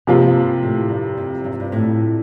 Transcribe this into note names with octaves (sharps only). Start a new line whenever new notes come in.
G2 C3 F3 A#3 F4
A2
G2
F2
G2
F2
G2
A2